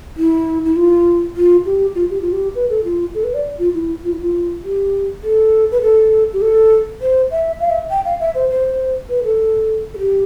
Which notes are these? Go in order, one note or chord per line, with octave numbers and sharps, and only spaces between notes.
E4
E4
F4
F4
G4
F4
G4
F4
G4
B4
A4
F4
A4
B4
D5
F4
E4
F4
E4
F4
G4
A4
B4
A4
G4
A4
C5
E5
F5
E5
G5
F5
E5
C5
C5
B4
A4
A4
G4